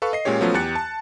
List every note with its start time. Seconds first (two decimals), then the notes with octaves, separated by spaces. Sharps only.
0.02 A4 B4 F5 C#6
0.13 D#5 C7
0.25 A#2 G#3 C#4 G4 C#5
0.41 F3 F#3 A3 B3 C#4 F4
0.54 E2 G4 F#6 A6 C#7
0.75 A5